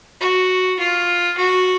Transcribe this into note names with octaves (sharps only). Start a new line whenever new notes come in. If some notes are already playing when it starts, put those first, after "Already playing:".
F#4
F4
F#4